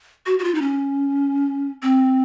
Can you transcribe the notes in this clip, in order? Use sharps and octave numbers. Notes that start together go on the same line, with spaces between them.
F#4
F#4
F4
D#4
C#4
C4